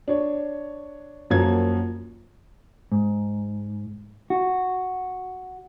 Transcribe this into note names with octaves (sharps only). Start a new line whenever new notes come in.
D4 C#5
F#2 F3 F#3 A#3 G#6
G#2
F#4